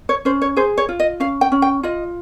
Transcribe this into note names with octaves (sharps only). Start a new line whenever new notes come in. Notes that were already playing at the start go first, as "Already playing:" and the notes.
C#5
C#4 C5
C#5
G#4 C5
C#5
F4
D#5
C#4 F5
G5
C#4
G5
F4 D#5